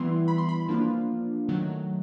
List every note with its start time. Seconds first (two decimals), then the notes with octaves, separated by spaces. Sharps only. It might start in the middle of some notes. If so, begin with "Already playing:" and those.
Already playing: E3 G3 B3 E4 C6
0.28 B5
0.38 C6
0.49 B5
0.68 F3 A#3 D4 F4
1.49 D#3 F#3 A3